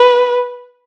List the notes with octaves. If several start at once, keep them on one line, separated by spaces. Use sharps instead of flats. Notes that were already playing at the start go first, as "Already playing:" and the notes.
Already playing: B4